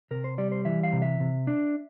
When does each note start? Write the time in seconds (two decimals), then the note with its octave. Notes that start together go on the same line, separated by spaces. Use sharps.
0.11 C3 A#4
0.24 C5
0.38 G3 D5
0.52 C5
0.65 E3 E5
0.83 F5
0.93 C3
1.02 E5
1.20 C3
1.47 D4